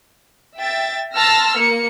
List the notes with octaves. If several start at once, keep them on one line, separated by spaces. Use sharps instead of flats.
E5 G5 A6
A5 C6 E6 F6 A#6
A#3 C#7